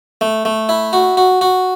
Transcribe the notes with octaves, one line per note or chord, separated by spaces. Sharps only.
A3
A3
E4
F#4
F#4
F#4